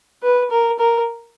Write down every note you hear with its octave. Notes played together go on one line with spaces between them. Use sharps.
B4
A#4
A#4